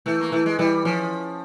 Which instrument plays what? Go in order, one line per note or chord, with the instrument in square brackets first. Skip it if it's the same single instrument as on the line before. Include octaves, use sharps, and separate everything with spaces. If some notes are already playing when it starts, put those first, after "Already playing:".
[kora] E3 [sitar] A3
[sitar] A#3
[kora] E3 [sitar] A3
[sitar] G#3
[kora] E3 [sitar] G3
[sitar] F3 [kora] C#4